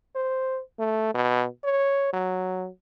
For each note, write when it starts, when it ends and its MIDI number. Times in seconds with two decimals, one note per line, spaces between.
0.15 0.60 72
0.79 1.13 57
1.14 1.46 47
1.64 2.12 73
2.13 2.68 54